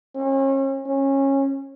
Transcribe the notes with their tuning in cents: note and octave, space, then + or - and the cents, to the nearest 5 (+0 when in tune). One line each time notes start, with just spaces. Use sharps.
C#4 -40
C#4 -20